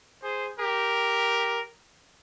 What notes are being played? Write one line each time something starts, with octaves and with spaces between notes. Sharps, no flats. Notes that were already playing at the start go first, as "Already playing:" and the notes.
G#4 C5
G4 A#4